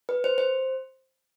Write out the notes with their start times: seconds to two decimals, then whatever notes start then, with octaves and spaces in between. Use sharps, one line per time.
0.09 B4
0.24 C5
0.38 C5